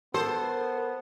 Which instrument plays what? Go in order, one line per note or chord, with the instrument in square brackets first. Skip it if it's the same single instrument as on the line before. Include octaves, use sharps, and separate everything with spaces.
[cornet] B3 [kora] A4 [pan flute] A#4 [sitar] C5